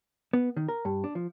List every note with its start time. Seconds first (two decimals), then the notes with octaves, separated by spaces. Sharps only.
0.33 B3
0.57 D#3
0.68 A#4
0.85 G2
1.04 D4
1.15 F3